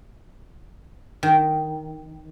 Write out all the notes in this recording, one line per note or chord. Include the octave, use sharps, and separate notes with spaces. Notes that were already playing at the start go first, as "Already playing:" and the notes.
D#3